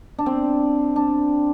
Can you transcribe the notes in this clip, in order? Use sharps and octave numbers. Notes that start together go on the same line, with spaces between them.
D4
C4
D4